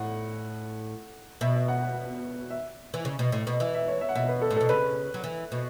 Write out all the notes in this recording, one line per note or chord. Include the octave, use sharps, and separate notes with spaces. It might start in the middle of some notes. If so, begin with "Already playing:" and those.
Already playing: A2 F#5
B2 E5
E5
F#5
F#5
E5
E3
C#3
B2
A2
B2
E3 E5
E5
C#5
E5
F#5
B2 E5
B4
A4
A2
B2 A4
C#3 B4
F#3
E3
B2